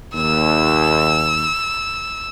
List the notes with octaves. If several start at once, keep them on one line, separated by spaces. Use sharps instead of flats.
D#2 E6